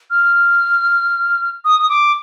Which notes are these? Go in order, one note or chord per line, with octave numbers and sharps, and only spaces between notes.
F6
D#6
D#6
D6